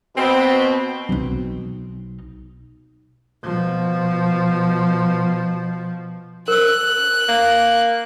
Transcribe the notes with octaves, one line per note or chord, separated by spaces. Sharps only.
B2 C4
B1 D#4
B2 F3
A#4 C5 E6 F#6
A#3